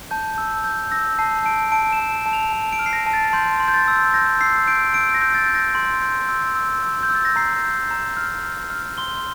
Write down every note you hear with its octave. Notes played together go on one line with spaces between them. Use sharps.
A5 G6
E6
G6
E6 A#6
A5 C7
A5 D7
A5 D7
E7
A5
A5
F7
A5
D7
F6
C7
A#6
A5
A6
C6 G6
C6
G6
A6
E6
G6 A#6
E6 C7
G6 D7
E6 D7
A#6
G6
A6
G6
A#6
C6
G6
E6
E6
E6
G6
E6
A6
A#6
A#5 C7
G6
A#5
F6
F6
F6
C6 G7